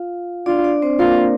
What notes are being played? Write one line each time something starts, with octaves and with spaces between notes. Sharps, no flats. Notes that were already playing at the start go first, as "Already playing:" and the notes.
Already playing: F4 F5
D4 F4 D5
D4 D5
C4 C5
A#3 F4 A#4